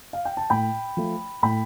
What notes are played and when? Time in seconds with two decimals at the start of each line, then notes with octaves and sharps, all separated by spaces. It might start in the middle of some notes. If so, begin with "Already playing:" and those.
0.13 F5
0.25 G5
0.37 A5
0.50 A2 G5 B5
0.97 F3 A3
1.43 A2 G5 B5